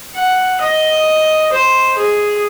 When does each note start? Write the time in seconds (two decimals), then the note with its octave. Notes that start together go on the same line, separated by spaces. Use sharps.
0.15 F#5
0.60 D#5
1.52 C5
1.97 G#4